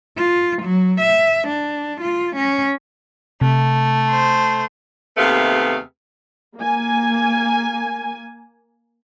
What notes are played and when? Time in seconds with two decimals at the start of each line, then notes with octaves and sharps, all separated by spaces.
0.17 F4
0.62 F#3
1.01 E5
1.48 D4
2.01 F4
2.36 C#4
3.41 C3 A3
4.11 C5
5.17 D#2 C3 A3 B3 G#4 F5
6.57 A#3 G#5